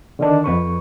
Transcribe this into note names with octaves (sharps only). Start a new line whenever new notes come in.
D3 D#3 D4
F2 B4 C#6